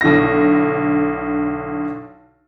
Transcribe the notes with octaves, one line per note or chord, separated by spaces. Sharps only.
B1 D3 E4 A#6